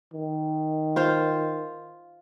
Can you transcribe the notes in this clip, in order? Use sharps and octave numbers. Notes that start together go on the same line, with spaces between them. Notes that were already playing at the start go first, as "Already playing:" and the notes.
D#3
F4 C5 F5